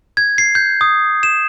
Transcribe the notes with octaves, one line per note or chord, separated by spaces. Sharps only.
G#6
C7
G6
D#6
E7